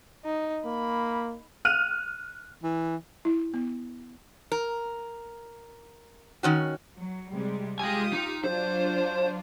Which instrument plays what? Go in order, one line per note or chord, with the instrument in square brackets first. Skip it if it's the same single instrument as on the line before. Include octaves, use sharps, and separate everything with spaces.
[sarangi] D#4
[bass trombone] A#3 [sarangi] B5
[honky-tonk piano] F6 F#6 D#7 F7
[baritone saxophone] E3
[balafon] E4
B3
[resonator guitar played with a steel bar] A#4
D#3 C#4 F#4
[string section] F#3
C3 G3 G#3
[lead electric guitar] G#3 G#5 [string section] F4 G4 D#6
[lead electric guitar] D#4
[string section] F#3 D4 F4 [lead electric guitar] C5